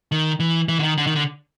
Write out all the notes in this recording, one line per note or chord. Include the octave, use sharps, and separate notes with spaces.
D#3
E3
E3
D3
D#3
D3
D#3
D3